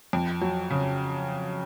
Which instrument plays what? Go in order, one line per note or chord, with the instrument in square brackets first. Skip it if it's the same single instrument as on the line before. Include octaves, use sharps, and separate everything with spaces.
[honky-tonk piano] F2
F#3
C#3